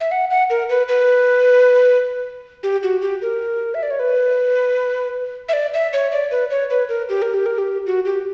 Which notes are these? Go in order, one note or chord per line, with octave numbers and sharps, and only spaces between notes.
E5
F#5
F#5
A#4
B4
B4
G4
F#4
G4
A#4
E5
D5
C#5
B4
E5
D5
E5
C#5
D5
B4
C#5
B4
A#4
G4
A#4
G4
A#4
G4
F#4
G4